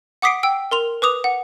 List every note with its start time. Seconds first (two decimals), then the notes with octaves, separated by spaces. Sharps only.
0.22 F#5 D6 D#6 B6 C7 D7
0.43 G5 E6 D7
0.71 A#4 C6 F7
1.02 B4 D6 D#6 F7
1.24 F#5